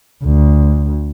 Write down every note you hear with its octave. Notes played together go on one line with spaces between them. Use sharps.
D2